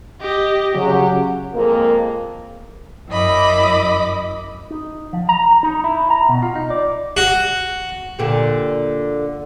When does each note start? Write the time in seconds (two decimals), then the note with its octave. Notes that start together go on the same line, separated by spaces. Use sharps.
0.21 G4 D#5
0.75 C#3 F#3 G4
1.54 F2 G#3 A#3
3.10 F#2 E4 D#5 B5 D6
4.71 D#4
5.13 F3
5.29 A#5
5.63 D#4
5.84 E4
6.10 A#5
6.29 B2
6.43 F4
6.55 D#4
6.70 D5
7.17 F#4
8.19 A#2 D3 G4